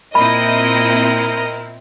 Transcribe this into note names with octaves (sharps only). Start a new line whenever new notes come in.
A#2 C4 E4 A#4 D#5 B5